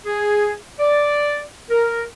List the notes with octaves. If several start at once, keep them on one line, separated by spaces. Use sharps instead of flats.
G#4
D5
A#4